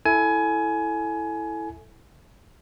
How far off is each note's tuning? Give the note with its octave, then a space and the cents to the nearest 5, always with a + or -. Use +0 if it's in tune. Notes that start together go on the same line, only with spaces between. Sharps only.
E4 +0 A4 +0 G#5 +20